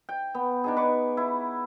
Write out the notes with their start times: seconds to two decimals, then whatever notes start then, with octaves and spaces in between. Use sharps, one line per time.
0.09 G5
0.35 B3
0.64 D4 D#4 G#4
0.77 B4 C#6 D6
1.17 E4